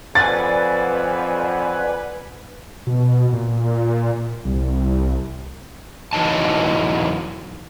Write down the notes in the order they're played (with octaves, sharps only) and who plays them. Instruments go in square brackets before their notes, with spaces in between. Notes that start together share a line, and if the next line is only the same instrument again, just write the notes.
[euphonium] F2 [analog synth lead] B4 [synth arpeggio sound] D5 F#5 G#5 [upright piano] A6
[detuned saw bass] B2
A#2
C2
[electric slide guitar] E2 E3 F#3 D#4 A5